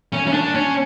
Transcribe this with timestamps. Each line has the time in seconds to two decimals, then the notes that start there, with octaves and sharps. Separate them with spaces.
0.13 C#4
0.27 C#4
0.33 D4
0.55 C#4